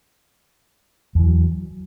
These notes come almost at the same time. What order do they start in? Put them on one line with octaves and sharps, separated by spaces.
E2 E3 F#3